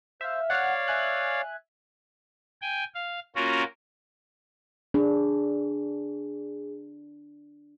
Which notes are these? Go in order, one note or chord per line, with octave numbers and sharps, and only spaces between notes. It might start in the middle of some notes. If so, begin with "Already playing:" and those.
C5 E5 F5
C#5 D5 F5 F#5 F6
E5 G#5 F#6
G5 G#5
F5
A#3 C#4 F4 F#4 A#4
D4 G#4